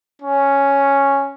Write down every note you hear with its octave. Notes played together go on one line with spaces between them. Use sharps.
C#4